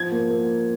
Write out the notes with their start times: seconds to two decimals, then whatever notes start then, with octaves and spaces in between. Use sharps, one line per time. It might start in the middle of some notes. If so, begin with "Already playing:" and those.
Already playing: F3 G#6
0.12 A#3
0.30 A#3